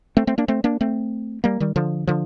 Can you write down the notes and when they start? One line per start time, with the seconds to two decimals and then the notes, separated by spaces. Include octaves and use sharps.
0.17 A3 C4
0.27 A3 C4
0.38 A#3 D4
0.48 A3 C4
0.64 A#3 D4
0.81 A3 C4
1.44 G3 A#3
1.60 D#3 G3
1.76 D3 F3
2.07 D3 F3